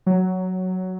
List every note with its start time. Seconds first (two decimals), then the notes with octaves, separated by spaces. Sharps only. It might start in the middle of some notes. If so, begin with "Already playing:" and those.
0.06 F#3